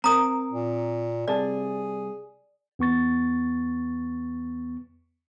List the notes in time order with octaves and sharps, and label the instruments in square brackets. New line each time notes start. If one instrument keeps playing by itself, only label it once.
[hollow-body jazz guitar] C4 A#4 [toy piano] A#5 D#6
[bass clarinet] A#2
[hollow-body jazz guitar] C2 C3 A5 [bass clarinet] G#4 [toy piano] D5
[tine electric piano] E2 B3 C#6 A6